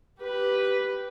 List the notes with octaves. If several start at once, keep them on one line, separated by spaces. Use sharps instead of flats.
G4 B4